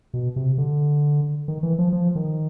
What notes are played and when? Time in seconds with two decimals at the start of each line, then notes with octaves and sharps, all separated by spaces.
0.14 B2
0.36 C3
0.58 D3
1.48 D#3
1.63 E3
1.79 F3
1.93 F3
2.15 D#3